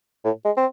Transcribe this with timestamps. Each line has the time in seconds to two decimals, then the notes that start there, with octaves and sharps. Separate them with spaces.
0.24 A2
0.45 G#3
0.57 C4